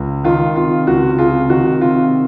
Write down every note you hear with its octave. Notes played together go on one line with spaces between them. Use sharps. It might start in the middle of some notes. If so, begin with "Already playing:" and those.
Already playing: C#2
D#3 F4
C3 F4
C#2 F#4
C3 F4 G#4
D#3 F#4
C3 F4